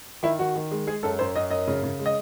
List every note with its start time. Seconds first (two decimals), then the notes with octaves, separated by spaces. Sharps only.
0.23 D#3 E4
0.39 D#3 F#4
0.56 D#3
0.71 G#3
0.87 G#3 G#4
1.03 F#2 A4
1.19 F#2 C5
1.36 F#2 D#5
1.50 F#2 D#5
1.68 C#3
1.83 C#3
1.99 G#3
2.06 D#5